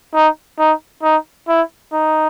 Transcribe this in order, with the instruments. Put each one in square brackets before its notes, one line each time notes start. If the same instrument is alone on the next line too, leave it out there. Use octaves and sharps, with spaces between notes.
[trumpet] D#4
D#4
D#4
E4
D#4